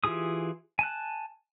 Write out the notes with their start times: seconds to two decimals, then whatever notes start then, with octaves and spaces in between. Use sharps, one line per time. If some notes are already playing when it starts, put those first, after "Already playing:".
0.04 E3 F4 G4 G#4 D#6
0.79 G#5 A5 F#6